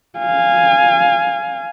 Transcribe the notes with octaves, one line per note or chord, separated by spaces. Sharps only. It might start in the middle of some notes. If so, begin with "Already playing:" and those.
F5 G#5